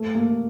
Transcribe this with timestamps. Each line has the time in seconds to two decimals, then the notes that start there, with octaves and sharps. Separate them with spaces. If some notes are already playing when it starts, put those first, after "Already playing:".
Already playing: A3
0.15 A#3